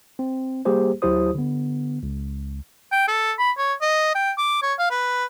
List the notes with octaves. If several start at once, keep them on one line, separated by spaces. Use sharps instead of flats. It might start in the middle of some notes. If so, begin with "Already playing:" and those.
C4
G3 A#3 G4 G#4 C5
D2 F#3 E4 G4 C5 D#6
D3 B3
C#2
G5
A4
B5
C#5
D#5
G5
D6
C#5
F5
B4